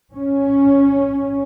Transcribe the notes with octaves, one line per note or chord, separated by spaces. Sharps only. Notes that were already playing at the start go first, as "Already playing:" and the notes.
C#4